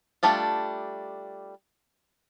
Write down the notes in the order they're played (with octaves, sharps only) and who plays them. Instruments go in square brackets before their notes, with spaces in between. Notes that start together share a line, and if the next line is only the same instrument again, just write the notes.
[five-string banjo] G3 A3 D4 F4